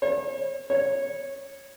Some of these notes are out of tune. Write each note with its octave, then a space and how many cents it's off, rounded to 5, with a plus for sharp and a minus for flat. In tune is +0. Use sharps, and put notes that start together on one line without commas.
C#5 -40
C#5 -15